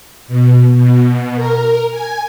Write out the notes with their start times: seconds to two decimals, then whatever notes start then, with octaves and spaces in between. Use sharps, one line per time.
0.28 B2
0.74 B2
1.35 A#4
1.91 G#5